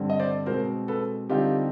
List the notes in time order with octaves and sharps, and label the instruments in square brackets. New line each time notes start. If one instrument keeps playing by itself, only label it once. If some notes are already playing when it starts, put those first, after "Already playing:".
Already playing: [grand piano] G2 D3 G3 C4
D#5
C5 D5
B2 G#3 C4 A#4 C5
A4 B4
D3 G3 C4 D#4 F4 G4